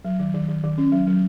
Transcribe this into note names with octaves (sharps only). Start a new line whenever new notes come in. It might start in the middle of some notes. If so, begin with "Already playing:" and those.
F#3
D#3
D#3
D#3
D#3
C#4
F#3
F#3